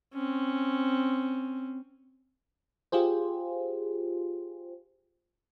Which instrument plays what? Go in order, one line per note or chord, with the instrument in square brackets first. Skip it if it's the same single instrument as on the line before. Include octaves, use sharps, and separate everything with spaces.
[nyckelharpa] C4 C#4
[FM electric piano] F4 G4 G#4 C5